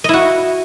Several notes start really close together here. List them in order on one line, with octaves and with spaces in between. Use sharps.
D#5 E4 F#4